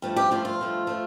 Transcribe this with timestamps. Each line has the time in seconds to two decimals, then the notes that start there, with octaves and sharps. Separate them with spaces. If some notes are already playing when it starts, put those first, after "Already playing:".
0.02 G2 F3 A3
0.16 G4
0.31 G2 F3 A3 F4
0.45 F4
0.59 G2 F3 A3
0.87 F3 A3